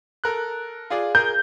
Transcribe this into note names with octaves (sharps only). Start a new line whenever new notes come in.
A4 A#4 F#6
F4 G#4 D5
G#4 A#4 G6